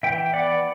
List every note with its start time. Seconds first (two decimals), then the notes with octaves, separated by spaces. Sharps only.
0.03 E3 E5 G5
0.33 B3 D5 F#5